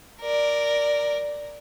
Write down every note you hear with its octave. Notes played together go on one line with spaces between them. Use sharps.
A#4 D5